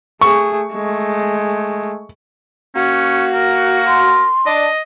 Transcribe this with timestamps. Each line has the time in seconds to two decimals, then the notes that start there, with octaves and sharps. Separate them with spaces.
0.21 A3 G#4 C#6
0.74 G#3 A3
2.76 A#3 C#4 F#4
3.34 A#4
3.88 C6
4.46 D4 D#5